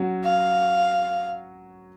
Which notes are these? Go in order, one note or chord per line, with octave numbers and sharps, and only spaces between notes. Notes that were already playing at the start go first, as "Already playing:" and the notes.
Already playing: F#3 C#4 F#4
F5